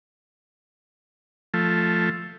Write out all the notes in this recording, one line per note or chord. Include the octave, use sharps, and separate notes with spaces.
F3 A3